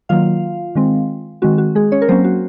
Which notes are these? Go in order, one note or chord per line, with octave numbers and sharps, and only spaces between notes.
D#3 F#3 A#3 F4 F5
D#3 G#3 C4
D#3 G#3 C4 F#4
F#4
G#3 G#4
C#4 C#5
A#4
F#3 A#3 C4 C#4 C5
F#4